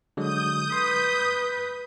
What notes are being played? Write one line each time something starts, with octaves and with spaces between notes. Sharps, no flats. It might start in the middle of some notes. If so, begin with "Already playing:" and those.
D3 F#3 G#3 D#6 G6
B4 C6